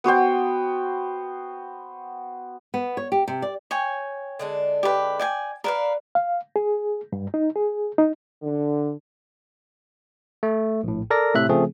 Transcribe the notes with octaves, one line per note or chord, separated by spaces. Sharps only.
B3 F#4 C5 G5
B3
C#5
G4
C3
D5
C#5 G5 G#5
D3 G#3 D4
G4 B4
D5 G5 G#5
D4 A#4 B4 F5
F5
G#4
G2
D#4
G#4
D#4
D3
A3
A#1 A2
A4 A#4 D5 A#6
A2 C3 E5 F#6
C#3 F3 A3 C4 G#4